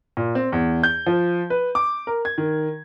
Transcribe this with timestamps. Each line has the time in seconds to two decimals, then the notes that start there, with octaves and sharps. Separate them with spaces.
0.17 A#2
0.35 C4
0.52 E2
0.83 G6
1.06 F3
1.50 B4
1.75 D6
2.07 A#4
2.25 G#6
2.38 D#3